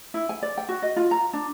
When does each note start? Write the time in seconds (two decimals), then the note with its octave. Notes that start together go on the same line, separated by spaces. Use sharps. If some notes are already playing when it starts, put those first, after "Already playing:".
0.14 E4
0.29 G#5
0.43 D5
0.58 G5
0.69 F#4
0.82 D#5
0.96 F4
1.11 A#5
1.33 D4